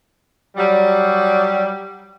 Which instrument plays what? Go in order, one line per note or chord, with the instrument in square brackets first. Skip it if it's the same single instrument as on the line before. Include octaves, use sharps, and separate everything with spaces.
[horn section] F#3 G3